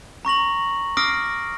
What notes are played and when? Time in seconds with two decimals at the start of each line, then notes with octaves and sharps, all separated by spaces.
0.25 A#5 C#6 A#6 F#7
0.97 D6 D#6 F6 A#6 C7 D7